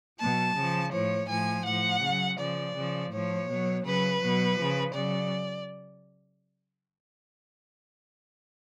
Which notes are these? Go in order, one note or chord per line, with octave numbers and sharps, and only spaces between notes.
B2 F#3 A5
C#3
F3
A2 F3 C#5
A2 F3 G#5
A2 F3 F#5
C#3
F#3
C#3 F3 D5
C#3 F3
A2 F3 C#5
B2 F#3
C#3 F#3 B4
B2 F#3
C#3 F3
C#3 F#3 D5